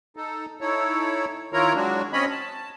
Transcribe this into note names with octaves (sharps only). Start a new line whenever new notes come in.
D#4 A4
D#4 E4 A4 C#5
D#3 E4 F4 A#4 C#5 A#5
F#3 G#3 D4 F#4
C4 C#4 C#5 D#5 B5
A5